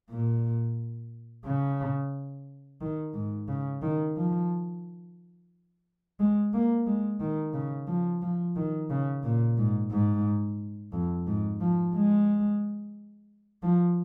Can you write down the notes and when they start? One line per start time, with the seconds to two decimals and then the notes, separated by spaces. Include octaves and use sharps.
0.10 A#2
1.45 C#3
2.81 D#3
3.14 G#2
3.49 C#3
3.82 D#3
4.17 F3
6.19 G#3
6.53 A#3
6.86 G#3
7.20 D#3
7.54 C#3
7.88 F3
8.22 F3
8.56 D#3
8.90 C#3
9.23 A#2
9.58 G#2
9.91 G#2
10.92 F2
11.27 G#2
11.61 F3
11.95 G#3
13.63 F3